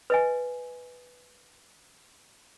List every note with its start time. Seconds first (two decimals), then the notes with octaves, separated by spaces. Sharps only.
0.10 B4 D#5 G#5